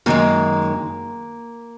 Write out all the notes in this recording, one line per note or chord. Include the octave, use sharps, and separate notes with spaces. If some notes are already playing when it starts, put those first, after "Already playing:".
F#2 D#3 G#3 A#3